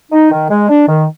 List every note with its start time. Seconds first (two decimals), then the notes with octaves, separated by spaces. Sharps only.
0.12 D#4
0.31 D#3
0.50 G#3
0.69 D4
0.88 D#3